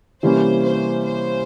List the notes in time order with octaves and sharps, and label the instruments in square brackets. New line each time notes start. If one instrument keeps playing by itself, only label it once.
[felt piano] C3 E3 G3 A#3 C#4 [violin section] C5
[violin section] C5
C5